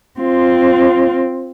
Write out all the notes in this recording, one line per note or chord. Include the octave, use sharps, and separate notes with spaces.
C4 F4